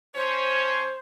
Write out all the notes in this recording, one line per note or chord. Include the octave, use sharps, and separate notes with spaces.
F3 C#4 C5 C#5